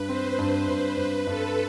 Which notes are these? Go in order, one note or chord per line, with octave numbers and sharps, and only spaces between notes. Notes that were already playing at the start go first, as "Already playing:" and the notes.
Already playing: G2 B4
C4 C5
G2
G2
G2 B4
G2 A4